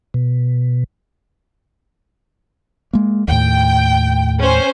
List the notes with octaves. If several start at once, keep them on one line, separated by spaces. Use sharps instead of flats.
B2
G#3 A#3
D#2 A2 G5
C#4 C5